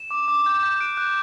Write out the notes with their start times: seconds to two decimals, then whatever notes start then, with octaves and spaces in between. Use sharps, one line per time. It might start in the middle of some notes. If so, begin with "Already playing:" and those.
Already playing: E7
0.11 D6
0.28 D6
0.46 G6
0.63 G6
0.80 F#6 D7
0.97 F#6